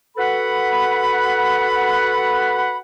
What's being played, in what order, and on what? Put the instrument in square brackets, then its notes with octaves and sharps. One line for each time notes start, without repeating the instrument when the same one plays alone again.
[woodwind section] F#4 A4 B4 F#5 B5